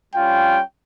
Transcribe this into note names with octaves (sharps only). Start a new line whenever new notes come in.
G3 C#4 F4 G5